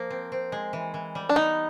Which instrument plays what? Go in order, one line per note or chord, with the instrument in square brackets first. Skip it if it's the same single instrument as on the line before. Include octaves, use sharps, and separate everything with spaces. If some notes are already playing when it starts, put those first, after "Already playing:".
Already playing: [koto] F3 A#3
C4
C4
G#3
E3
E3
G3
[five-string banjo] D4
[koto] B3 [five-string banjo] D#4